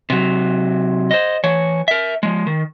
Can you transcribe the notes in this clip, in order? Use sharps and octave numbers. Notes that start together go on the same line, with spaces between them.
C3 F#3
C5 D#5
E3 C#5
A#4 E5
F3 G#3
D#3